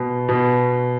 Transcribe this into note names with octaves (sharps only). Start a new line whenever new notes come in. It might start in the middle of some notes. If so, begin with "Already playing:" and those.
Already playing: B2
B2